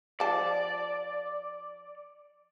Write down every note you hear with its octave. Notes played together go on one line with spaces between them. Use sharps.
F3 D5 A5